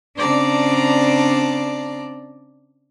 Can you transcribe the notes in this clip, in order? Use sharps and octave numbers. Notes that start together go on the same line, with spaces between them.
C#3 C4 D4 D5 A5 A#5